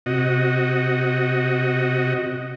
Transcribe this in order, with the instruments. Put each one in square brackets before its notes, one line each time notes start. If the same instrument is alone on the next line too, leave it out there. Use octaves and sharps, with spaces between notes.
[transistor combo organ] C3 F#4 D#5